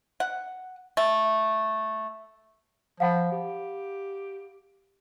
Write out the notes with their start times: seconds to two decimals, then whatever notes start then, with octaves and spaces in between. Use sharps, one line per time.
0.20 F#5
0.97 A3
3.00 F3 F5 F#5 B5
3.32 G4